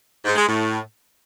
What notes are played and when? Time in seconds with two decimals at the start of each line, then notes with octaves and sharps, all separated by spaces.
0.24 G#2
0.36 G#3
0.47 A2